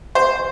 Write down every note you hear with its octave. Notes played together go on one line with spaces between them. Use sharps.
C5